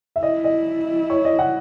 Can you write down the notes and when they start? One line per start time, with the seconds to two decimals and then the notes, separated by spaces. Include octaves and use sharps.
0.16 E5
0.22 E4 D#5
0.44 D#5
1.10 C#5
1.25 D#5
1.39 F#5